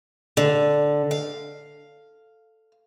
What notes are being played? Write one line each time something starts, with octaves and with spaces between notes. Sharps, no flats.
D3
F5